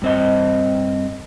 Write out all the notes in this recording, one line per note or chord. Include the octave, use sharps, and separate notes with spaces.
G2 C4 D#5